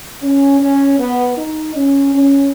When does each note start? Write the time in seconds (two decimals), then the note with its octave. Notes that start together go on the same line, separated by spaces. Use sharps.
0.22 C#4
0.60 C#4
0.99 B3
1.37 D#4
1.75 C#4
2.14 C#4